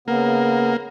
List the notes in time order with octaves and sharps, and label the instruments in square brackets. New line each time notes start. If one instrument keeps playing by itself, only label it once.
[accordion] C#3 B3 [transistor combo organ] A#3